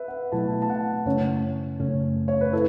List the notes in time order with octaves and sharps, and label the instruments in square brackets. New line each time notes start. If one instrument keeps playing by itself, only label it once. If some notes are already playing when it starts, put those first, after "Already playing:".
Already playing: [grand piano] B4 E5
F#5
[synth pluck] B2 F#3 A3 E4 [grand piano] A5
[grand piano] A5
F#5
[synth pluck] F#2 C#3 A3 C#4 [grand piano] C#5
[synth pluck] F#2 C#3 A3 C#4
[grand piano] C#5
B4
[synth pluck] E4 [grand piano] A4